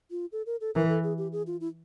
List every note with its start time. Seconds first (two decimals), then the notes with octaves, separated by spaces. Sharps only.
0.11 F4
0.32 A4
0.46 A#4
0.61 A4
0.75 E3 A#4
0.89 A4
1.03 G#4
1.18 G4
1.32 G#4
1.47 F4
1.60 E4